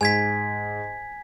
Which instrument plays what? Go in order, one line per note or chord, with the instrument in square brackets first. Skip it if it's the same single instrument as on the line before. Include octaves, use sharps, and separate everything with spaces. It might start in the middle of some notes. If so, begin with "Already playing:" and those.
[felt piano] G#2 [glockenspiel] G#5 G#6 B6